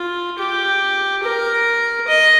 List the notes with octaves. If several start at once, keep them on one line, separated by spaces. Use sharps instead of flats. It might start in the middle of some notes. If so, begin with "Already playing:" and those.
Already playing: F4
G4
A#4
D#5